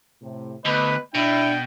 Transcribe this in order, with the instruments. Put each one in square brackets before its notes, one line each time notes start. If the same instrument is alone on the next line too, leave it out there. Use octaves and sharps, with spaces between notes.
[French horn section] A2 C3
[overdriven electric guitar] D2 [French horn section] B3 D#5 [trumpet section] B4
[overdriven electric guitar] B2 [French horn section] D4 [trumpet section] E4 [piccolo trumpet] G5